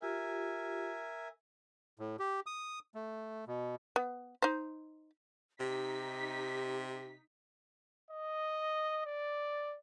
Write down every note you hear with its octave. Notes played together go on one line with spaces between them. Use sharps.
F4 G4 A#4 E5 G#5
A2
G4
D#6
A3
B2
B3
D#4 C5
C3 D#4 G4 B6
D#5
D5